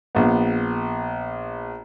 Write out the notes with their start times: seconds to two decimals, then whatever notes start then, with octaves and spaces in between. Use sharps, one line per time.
0.15 A#1 B3